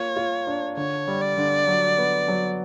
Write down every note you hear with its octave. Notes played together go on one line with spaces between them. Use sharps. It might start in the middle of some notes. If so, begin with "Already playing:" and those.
Already playing: A#3 F4 C#5
F4
D4
D3 C#5
G3
D5
D3
F#3
B3
F#3